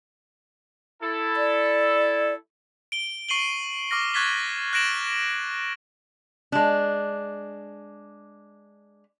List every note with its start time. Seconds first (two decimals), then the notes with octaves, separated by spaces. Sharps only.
1.03 E4 A4
1.36 D5
2.92 D7 G7
3.29 C#6 C7 D#7 F#7 G7
3.91 C#6 D6 F6 A#6
4.14 C#6 F#6 G#6 A6 B6 G7
4.73 F#6 G#6 A#6 D7 E7 F#7
6.52 G#3 D4